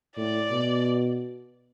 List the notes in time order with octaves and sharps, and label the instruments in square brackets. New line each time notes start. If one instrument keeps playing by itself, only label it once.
[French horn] A2 [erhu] D5
[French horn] B2